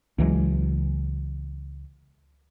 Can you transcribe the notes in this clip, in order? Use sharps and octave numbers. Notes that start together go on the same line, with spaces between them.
C#2 E3 F#3 G#3